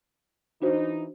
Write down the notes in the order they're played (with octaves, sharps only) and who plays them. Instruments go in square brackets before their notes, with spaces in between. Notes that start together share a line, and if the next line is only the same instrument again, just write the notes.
[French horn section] E3 D#4 [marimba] D4 F#4 C5